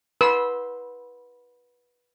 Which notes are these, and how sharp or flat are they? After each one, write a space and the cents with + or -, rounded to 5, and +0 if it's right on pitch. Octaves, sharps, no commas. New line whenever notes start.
B4 -15 C6 -5 E6 -15